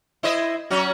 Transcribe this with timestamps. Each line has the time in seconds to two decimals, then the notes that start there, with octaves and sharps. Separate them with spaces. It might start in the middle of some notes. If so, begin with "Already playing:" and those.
0.23 E4 C5 D#5
0.70 F#3 C#4 F#4